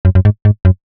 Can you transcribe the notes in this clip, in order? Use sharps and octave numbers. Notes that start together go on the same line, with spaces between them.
F#2
F#2
G#2
G#2
F#2